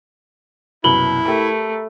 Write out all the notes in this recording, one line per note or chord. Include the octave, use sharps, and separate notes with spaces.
C2 F#2 B2 E4 B5 F#7 G7
A3 G4 A#4